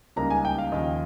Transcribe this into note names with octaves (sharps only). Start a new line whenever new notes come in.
C#2 C#3 G3 A#3 D#4 A#5
G#5
G5
F5
D#2 C#3 F3 D#5